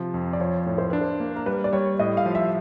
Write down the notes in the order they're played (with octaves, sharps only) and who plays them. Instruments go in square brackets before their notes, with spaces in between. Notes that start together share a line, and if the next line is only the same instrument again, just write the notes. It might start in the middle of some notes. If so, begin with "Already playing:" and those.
Already playing: [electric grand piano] C3 F3
F2
[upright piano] D5
[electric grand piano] F3 [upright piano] C#5
[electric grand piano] A2 [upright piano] C#5
[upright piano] C5
[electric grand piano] D4 [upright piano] B4
[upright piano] C5
[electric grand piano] A#3
[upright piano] A#4
[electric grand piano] G3 [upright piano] B4
[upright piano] D5
[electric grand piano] G3 [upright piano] C#5
[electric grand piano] A2 [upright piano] D#5
[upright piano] F5
[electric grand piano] F3
[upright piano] E5